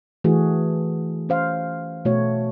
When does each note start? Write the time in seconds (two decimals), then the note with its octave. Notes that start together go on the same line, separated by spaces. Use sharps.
0.24 E3 A3 F#4 G#4
1.29 C#4 C5 F5
2.05 B2 A3 F#4 C#5